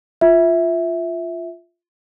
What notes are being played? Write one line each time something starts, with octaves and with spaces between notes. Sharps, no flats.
F4 E5